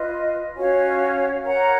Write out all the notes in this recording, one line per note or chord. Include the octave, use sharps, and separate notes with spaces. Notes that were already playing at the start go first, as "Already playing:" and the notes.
Already playing: F4 B4 D#5
C#4 F#4 C#5 F5
A#4 C#5 F#5 A#5